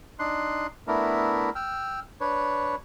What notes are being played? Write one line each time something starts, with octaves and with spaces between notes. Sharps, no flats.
D4 D#4 C6 F#6
A3 B3 D4 E4 A#4
G5 E6 F6
D4 B4 C#5